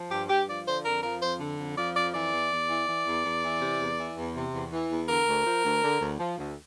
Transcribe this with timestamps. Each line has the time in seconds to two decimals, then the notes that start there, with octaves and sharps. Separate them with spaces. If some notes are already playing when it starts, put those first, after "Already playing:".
Already playing: F3
0.11 G2 G4
0.30 G2 G4
0.48 F3 D5
0.66 D3 C5
0.85 F2 A#4
1.03 F3 A#4
1.22 F2 C5
1.40 D3
1.59 F2
1.77 F3 D5
1.96 F2 D5
2.14 E3 D5
2.33 E2
2.51 E2
2.69 E3
2.88 E3
3.06 E2
3.25 E2
3.43 E3
3.61 C3
3.80 E2
3.98 E3
4.17 E2
4.36 C3
4.54 E2
4.72 E3
4.90 E2
5.09 D3 A#4
5.28 D2
5.46 F3
5.65 D2
5.83 D3
6.01 D2
6.20 F3
6.38 D2